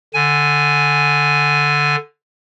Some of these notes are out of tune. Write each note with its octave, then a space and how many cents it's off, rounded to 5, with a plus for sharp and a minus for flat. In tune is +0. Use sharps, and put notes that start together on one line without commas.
D3 +0 G#5 +0